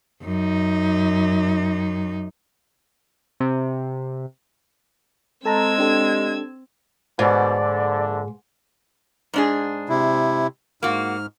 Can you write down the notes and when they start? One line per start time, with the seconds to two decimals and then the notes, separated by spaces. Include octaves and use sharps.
0.23 F#2 D#4
3.40 C3
5.45 G#3 C4 A4 A5 A#5 E6 G#6
5.78 D4 G4 A4
7.19 G#2 B2 D3 D5
7.59 A#1 D3
9.34 G#2 D4 G#4
9.89 C3 E4
10.83 G#2 A#3 F#4 F6